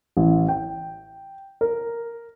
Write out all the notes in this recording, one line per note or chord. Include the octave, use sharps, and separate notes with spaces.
A1
G5
A#4